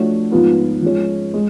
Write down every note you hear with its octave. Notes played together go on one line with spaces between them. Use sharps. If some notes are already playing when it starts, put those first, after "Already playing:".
Already playing: F3 A3 D4 F#4 C#5
G#2 F3 B3 F4 B4
F3 G#3 C#4
G#3